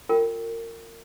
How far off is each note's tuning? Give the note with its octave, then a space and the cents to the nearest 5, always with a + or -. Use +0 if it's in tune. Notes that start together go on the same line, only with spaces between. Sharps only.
F4 +10 A#4 -30 G5 +0